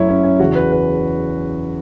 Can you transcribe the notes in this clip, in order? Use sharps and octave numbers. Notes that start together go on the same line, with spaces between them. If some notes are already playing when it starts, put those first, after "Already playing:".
Already playing: F#2 F#3 A3 E4 C#5
C#4
C#4
E2 C#3 E3 F#4
B4
B4